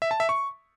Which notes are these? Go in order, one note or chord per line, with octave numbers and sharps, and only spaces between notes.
E5
A5
E5
C#6